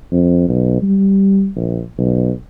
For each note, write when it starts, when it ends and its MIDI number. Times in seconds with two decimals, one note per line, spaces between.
0.11 0.44 41
0.48 0.81 35
0.82 1.49 55
1.56 1.82 34
1.98 2.32 35